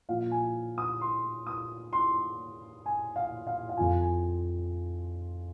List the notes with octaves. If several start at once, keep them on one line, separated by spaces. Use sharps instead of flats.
A#2 F3 F5
G#5
D#6
C6
D#6
C6
G#5
F5
F5
F5
F2 F3 G#5
G#5